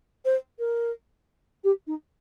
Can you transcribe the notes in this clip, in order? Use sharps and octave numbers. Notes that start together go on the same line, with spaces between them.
C5
A#4
G4
D#4